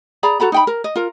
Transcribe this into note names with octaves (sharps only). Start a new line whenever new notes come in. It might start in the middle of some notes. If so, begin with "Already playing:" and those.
G#4 D5 A#5 B5
F#4 A4 A#5 B5
D#4 G5 B5
A#4
D#5
F4 A#4